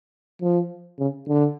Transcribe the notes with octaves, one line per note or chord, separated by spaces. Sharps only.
F3
C#3
D3